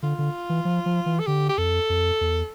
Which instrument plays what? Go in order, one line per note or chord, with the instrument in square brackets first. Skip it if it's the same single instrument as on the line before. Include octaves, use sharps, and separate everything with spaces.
[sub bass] D3 [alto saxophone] F4
[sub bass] D3
E3
F3
F3
E3
[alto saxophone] A4
[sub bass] D3 [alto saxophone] G4
[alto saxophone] G4
[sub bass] F2 [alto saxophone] A4
[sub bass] F2
E2